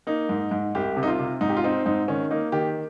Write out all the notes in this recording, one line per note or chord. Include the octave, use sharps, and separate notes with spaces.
A#3 D#4
G#2
G#2
C2 G4
C3
D#4
F4
C3
G#2 D#4
G4
F4
C4 D#4
G#2 D#4
D#3 C#4
A#3 D#4
D#3 G4